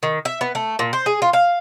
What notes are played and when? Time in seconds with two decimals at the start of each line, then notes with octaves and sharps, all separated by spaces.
0.03 D#3
0.25 E5
0.41 B3
0.55 A3
0.79 A#2
0.93 C5
1.06 G#4
1.22 F4
1.33 F5